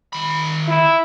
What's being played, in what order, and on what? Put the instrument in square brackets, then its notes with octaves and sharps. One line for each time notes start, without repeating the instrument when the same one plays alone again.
[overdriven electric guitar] D#3 B5
[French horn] E4